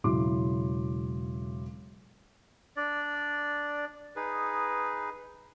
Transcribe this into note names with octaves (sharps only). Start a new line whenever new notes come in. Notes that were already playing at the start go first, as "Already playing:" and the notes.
E1 C#3 F#3 E4 C6 D6
D4 D5
D#4 G#4 B4